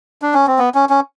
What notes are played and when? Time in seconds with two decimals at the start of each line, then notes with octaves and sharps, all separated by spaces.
0.22 D4
0.34 C#4
0.47 C4
0.59 B3
0.75 C#4
0.90 C#4